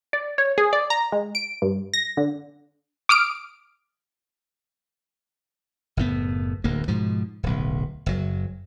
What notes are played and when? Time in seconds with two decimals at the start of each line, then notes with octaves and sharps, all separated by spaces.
0.13 D5
0.38 C#5
0.58 G#4
0.73 D5
0.90 A#5
1.12 G#3
1.35 D7
1.62 G2
1.94 A#6
2.17 D3
3.09 D6 D#6 F6 D7
5.97 F#1 A2 B3
6.64 D1 D2 A#3
6.88 G#2 B2 F3
7.43 D1 B1
8.06 F#1 F#3